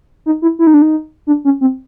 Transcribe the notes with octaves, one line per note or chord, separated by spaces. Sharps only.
D#4
E4
E4
D#4
D4
D#4
D4
C#4
C4